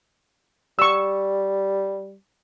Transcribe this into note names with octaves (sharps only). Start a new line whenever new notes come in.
G3 C#6 E6